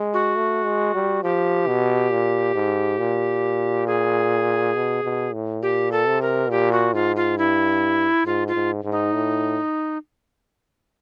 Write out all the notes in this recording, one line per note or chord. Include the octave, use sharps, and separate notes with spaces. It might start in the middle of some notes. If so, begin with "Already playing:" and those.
Already playing: G#3
F#4
A3
G#3
G3
F3 G4
B2
A#2
G#2
A#2
G#4
B2
B2
A2
A#2 G4
A4
C3
A#4
A#2 G4
F#4
G#2 F4
F4
G2 E4
G#2 F4
F4
G#2
G#2
D#4
A2